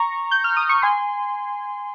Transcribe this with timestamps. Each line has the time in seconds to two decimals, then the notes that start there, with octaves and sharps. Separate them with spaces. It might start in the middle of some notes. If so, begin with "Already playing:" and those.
Already playing: A#5 C#6
0.31 G6
0.44 F6
0.57 D#6
0.69 C#6
0.82 G#5 C6